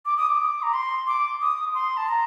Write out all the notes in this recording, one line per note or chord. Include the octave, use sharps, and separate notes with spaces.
D6
D#6
D6
A#5
C6
D6
D#6
C6
A5
A#5